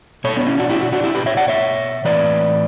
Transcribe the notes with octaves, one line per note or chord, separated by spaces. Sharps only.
B2 A4 C#5
B3 D4
C#4 E4
D4 F#4
E4 G4
D4 F#4
D4 F#4
E4 G4
G4 B4
C#5 E5
D5 F#5
C#5 E5
A2 E3 B4 D5